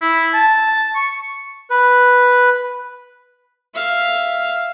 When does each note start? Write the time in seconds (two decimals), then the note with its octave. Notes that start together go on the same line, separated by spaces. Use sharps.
0.02 E4
0.34 A5
0.95 C#6
1.70 B4
3.74 E5 F5